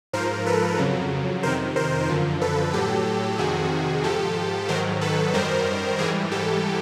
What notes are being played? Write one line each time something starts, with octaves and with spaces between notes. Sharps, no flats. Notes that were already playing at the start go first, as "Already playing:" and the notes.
G#2 F3 A#4 C5
A4 B4
F2 C#3 F#3
F2 C3 D#3 A#4 C5
A#4 C5
F#2 D3 F3
A4 B4
A2 F#3 G4 A4
F2 C3 D#3 F#4 G#4
G#2 F3 G4 A4
G#2 D#3 F#3 A#4 C5
A4 B4
F#2 D#3 G3 A#4 C5
G#2 E3 G3 G#4 A#4
G4 A4